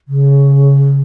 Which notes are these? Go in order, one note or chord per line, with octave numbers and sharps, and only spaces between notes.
C#3